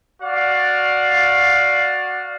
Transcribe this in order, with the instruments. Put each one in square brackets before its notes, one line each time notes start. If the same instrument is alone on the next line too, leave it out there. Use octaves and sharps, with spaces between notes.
[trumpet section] F#4 D5 F5